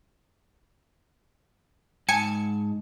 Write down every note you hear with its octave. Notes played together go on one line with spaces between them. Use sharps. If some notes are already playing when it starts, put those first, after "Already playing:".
G#2 G#5 A5 C#7